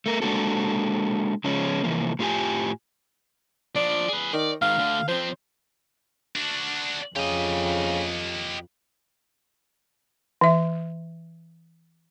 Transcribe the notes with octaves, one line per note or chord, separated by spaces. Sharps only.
A3 A#4
G#3 A#3 D4 F#4 A4
C#3 F3 G#3 C#4
C3 E3 F3 A#3
A2 F4 G4 G#5
F3 D4 D5
G#4 B4
D#3 D5
G#2 D#3 F5
D2 D3
F3 C4 C5
D4 F#4
F2 C#3 G4 D#5
E3 E5